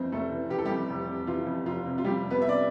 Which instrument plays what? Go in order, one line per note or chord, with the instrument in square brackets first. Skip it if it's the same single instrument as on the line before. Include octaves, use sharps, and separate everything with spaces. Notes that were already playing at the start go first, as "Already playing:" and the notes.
Already playing: [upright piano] F2 E3 C4 C5
F1 A3 A4
E3
E3 G4
A4
F2 G3 G4
F1
C3
E3 F4
F2
F1 F4
C3
F4
F1 G3 G4
F2
B3 B4
C3 E5
D5